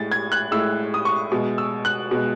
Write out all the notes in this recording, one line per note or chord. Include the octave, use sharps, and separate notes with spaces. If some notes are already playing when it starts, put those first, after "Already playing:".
Already playing: A2 G#3 A6
G#6
F#6
A2 G#3 E6
D#6
C#6
B2 G#3
E6
F#6
B2 G#3